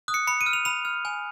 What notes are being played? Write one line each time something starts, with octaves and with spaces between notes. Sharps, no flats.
D#6 F#6
C#7
B5 C#7
D#7
F6
F7
B5 F7
F6
G#5